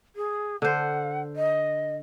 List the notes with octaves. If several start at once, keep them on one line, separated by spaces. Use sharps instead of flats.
G#4
D3 C5 F#5
D#5